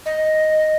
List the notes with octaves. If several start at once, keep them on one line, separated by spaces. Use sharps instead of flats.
D#5